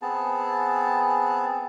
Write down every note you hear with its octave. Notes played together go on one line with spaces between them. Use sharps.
B3 C4 G#4 A5